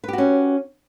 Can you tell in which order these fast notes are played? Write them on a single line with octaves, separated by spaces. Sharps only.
B4 G4 F#4 C#4